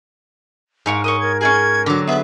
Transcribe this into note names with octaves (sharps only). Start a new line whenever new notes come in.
G#2 A#4 C#5 F5
A#4 C#5 D#5 D#6
A#4 G#6
C#4 D4 G#4 G#6
D3 F#3 A#5 D6
B3 G#4 B4 E5